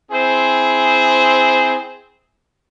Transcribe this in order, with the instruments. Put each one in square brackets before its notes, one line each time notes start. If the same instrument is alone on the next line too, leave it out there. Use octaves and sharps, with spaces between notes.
[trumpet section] C4 E4 G#4 C5